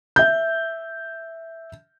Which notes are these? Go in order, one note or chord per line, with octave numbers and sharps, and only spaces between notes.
E5 G6